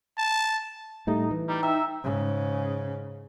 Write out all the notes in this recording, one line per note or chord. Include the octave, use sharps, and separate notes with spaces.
A5
A2 G3 A3 D#4
E3
G3 D#4
E5 G5 A#5 E6
G#2 C#3